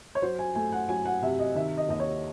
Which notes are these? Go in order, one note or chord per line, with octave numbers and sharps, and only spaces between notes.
C#5
F#3 C5
G#5
A3 G#5
F#5
F#3 G#5
F#5
C3 E5
D#5
D#3 E5
D#5
D#2 D#5
C#5